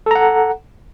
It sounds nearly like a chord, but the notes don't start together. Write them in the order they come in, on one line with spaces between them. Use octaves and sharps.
A4 A#5 F#5